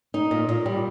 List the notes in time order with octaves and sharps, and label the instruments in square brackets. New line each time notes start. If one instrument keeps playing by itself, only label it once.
[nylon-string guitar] D#4
A#2
A#2
G3